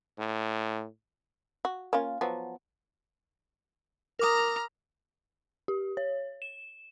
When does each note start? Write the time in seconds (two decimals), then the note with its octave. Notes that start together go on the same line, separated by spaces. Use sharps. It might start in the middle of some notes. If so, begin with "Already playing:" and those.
0.19 A2
1.65 F#4
1.93 A#3 C#4 F4
2.21 F3 F#3 B3
4.19 A#4 A#5 D6 D#6 F6
5.68 G4
5.97 C#5
6.42 E7